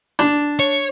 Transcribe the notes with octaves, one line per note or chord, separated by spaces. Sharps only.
D4
C#5